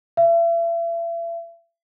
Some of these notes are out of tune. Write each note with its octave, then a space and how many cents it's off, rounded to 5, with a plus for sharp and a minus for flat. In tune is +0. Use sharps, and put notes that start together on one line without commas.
E5 +40